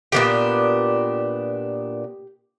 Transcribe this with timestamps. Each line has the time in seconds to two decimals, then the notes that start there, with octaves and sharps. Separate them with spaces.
0.12 A#2 G3 B3 D4 G4